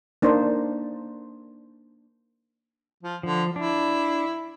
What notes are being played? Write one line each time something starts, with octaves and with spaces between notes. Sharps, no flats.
A#3 D4 D#4 C5
F3
D3 F3
D4 E4